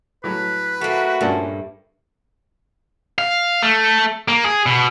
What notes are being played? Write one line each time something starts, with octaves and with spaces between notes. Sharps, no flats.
A2 F#3 B4
A3 A#3 F#4
G2 A#2 C#4 A5
F5
A3
A#3
G#4
B2